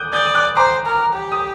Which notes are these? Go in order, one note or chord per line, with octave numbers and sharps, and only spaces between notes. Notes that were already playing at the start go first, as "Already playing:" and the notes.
Already playing: D6 D#6 F#6 G6
D5 D#6 G6
D#6
D6 F#6
C5 A#5 D6
A#4
G4
D#6